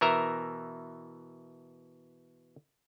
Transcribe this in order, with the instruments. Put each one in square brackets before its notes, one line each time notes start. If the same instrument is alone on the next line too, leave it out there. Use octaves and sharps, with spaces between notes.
[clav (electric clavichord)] B2 E3 A#4 E5 A#5